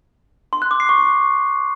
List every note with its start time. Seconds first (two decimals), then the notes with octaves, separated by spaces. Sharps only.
0.53 C6
0.62 F#6
0.71 D6
0.80 C7
0.89 C#6